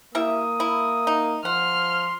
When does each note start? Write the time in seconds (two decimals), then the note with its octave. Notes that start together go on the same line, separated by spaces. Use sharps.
0.15 G3 A#3 E4 E5 D#6
0.60 E4
1.07 D#4
1.45 F3 F#5 C6 F6